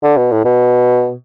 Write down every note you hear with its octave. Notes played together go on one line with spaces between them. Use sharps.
D3
B2
A2
B2